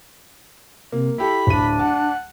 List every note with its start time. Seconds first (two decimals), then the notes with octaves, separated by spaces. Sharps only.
0.92 C3 A#3
1.18 E4 G4 A4 B5
1.47 D1 D4 D#7
1.79 F#5 A5